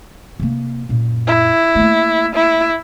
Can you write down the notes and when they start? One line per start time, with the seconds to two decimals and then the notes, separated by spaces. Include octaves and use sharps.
0.40 C3 A#3
0.89 F#2 A#2
1.27 E4
1.75 A3 A#3
2.35 E4